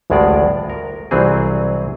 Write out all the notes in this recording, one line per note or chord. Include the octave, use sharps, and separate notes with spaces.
A1 D2 A2 G#3 F4 D5
A#4
C2 E3 F#3 C4 G#4